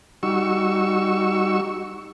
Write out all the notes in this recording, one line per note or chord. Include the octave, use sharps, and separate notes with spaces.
G3 D#4 F#4 C#6 E6